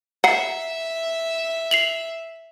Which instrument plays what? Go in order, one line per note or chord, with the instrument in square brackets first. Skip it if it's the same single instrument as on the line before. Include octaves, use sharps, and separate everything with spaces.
[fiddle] E5 [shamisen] F#5 [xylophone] A#5 C7
[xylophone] C7 F7 F#7